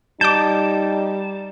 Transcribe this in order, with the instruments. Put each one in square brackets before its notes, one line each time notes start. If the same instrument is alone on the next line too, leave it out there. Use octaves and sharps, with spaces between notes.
[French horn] G3 [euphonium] D#4 [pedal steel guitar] A5 [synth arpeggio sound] D6 G6